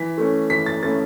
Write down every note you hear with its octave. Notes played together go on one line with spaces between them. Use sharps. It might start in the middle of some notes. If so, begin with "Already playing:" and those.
Already playing: E3 B6
A3 C#4
E3 B6
A6
A3 C#4 A6